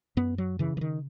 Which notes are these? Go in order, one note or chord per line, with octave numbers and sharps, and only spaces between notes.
F#2 B3
F#3
C#3 E3
E3
D#3